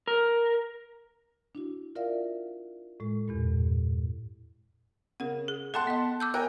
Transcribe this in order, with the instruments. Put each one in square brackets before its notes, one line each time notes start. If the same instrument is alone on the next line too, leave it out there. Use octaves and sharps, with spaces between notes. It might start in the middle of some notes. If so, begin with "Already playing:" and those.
[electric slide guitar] A#4
[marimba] D4 E4 F#4
F4 A#4 D5 E5 F5
A2 G#3
E2 G2 A#2
[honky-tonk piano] C#3 [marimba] A#4 F#5
[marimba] G#4
[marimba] A4 G5 F#6 [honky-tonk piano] F#5 A5 C6
[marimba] B3 D#5
D6 E6 G6
[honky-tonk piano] A#4 G5 G#5 [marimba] F#6